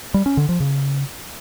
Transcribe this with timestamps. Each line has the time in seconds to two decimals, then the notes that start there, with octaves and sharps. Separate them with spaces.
0.14 G3
0.26 C#4
0.37 D3
0.49 F3
0.60 C#3